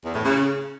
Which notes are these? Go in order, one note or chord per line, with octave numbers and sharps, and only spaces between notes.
E2
A2
C#3